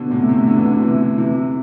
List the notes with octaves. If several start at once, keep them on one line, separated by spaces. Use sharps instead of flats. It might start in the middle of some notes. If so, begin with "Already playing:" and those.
Already playing: B2 D3
A2 C3
A2 C3
D3
E3
B2 D3
C3 E3
C3 E3